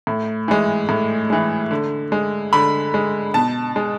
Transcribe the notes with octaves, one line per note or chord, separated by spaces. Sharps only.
A2
E3 G#3
A2
E3 G#3
D3
G#3
D3 B5
G#3
B2 A5
G#3